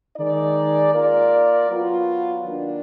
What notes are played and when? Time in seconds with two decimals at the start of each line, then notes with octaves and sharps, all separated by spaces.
0.16 D#3 G#3 D#4 G#4 D5
0.92 A#3 F4 A#4 D5
1.68 F#3 B3 F4
2.43 D#3 A#3 D4